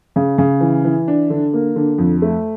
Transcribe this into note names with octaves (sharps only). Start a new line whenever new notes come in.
C#3
C#3
E3
E3
D4
D3
A#3
D3
F2
A3